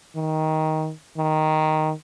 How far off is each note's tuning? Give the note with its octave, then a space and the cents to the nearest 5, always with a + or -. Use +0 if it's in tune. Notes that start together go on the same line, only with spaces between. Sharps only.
D#3 +15
D#3 +0